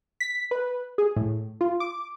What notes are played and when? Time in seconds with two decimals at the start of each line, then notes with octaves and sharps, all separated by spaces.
0.20 B6
0.51 B4
0.98 G#4
1.16 A2
1.61 F4
1.80 D6